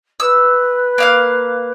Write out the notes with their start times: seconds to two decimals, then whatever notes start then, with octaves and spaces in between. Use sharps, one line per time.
0.20 B4 E6
0.98 A#3 F5 F#6